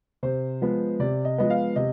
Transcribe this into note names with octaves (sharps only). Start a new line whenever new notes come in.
C3 C5
F3 G#3 B3
C3 D5
D#5
F3 G#3 B3 D#5
F5
C3 D#5